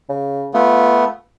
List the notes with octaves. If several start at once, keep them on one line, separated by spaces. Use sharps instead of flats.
C#3
A3 B3 F4